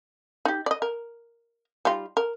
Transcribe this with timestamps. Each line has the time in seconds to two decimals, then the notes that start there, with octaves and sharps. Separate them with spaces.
0.45 D#4 G4
0.66 D5 D#5
0.82 A#4
1.85 G3 D#4 F4
2.17 A#4